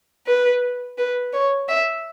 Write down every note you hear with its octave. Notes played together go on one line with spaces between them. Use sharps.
B4
B4
C#5
E5